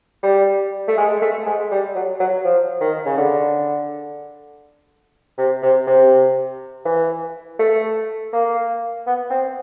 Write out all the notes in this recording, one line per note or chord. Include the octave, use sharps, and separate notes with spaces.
G3
A3
G#3
A3
G#3
G3
F#3
F#3
F3
D#3
C#3
D3
C3
C3
C3
E3
A3
A#3
B3
C4